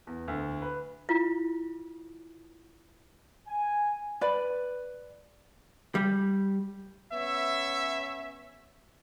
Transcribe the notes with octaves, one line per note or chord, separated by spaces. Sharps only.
E2
D2
B4
E4 F4
G#5
B4 D5 B5
G3
B3 C#4 C#5 E5